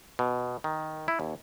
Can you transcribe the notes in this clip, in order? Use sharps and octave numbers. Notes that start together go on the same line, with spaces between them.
B2
D#3
E4
D#2